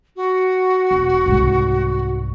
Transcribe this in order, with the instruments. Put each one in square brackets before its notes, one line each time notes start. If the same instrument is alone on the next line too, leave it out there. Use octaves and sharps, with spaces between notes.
[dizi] F#4
[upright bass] E1
C2 G#2